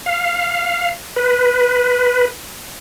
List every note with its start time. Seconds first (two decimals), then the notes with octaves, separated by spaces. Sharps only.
0.06 F5
1.16 B4